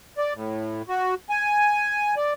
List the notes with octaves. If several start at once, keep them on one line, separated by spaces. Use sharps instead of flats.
D5
A2
F#4
G#5
D5